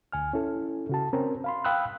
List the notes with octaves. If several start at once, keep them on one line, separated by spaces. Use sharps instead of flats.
D2 G#5 F6
C#4 E4 A4
C#3 F#4 A5
C4 C#4 A#4 A#5
F5 B5 C6
F5 G5 B5 D#6 E6 F#6